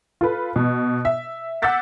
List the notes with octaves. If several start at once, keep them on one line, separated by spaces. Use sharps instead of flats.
F4 A4 B4
B2
E5
F#5 D6 E6 G6 A6 B6